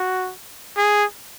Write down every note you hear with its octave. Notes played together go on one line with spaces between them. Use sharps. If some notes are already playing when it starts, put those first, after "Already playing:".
Already playing: F#4
G#4